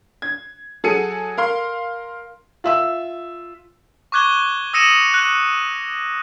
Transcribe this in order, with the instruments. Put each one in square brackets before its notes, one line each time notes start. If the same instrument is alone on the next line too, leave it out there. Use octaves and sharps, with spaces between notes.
[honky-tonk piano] G#6
F#3 G#4 A4 G#5 C#7 D#7
A#4 F5 C6
[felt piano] F4 E5 E6
[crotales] C#6 D6 F#6 G#6 G7
D#6 E6 A#6 C#7 D#7 E7
F#6